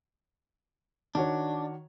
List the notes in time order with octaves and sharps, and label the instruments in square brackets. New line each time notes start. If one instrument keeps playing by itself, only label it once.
[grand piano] D#3 F#4 C#5 [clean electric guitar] D4